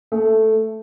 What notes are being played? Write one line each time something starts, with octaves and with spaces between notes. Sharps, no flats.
A3